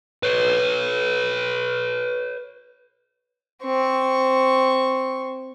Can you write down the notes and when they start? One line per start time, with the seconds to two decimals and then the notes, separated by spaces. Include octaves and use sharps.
0.23 B4 C#5
3.63 C4 C#6